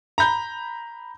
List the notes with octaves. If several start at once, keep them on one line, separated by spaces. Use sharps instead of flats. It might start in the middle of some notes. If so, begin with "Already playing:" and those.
A#5 B5 G6